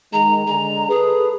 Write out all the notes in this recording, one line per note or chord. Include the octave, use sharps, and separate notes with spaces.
D#3 G#3 A#5
D3 G#3 A#5
G#4 A4 B4